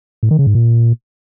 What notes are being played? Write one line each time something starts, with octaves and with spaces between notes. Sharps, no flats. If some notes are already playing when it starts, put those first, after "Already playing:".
A2
D#3
C#3
G#2
A#2